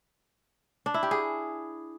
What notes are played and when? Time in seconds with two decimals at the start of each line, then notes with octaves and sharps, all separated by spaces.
0.86 D4
0.94 E4
1.03 G4
1.11 G#4